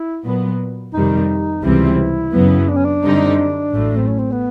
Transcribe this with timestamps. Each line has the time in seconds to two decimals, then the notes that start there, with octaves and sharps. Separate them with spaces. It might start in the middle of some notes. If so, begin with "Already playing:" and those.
Already playing: E4
0.25 A#2 F#3 B3
0.93 F2 C3 D#3 G3 D#4
1.64 C#2 C3 E3 G3 C4 E4
2.33 F#2 C#3 F#3 B3
2.69 D4
2.76 C#4
2.85 D4
3.04 F#2 D3 G3 C4 D#4
3.72 A1 A2 F#3 A3
3.97 C4
4.07 C#4
4.19 C4
4.32 B3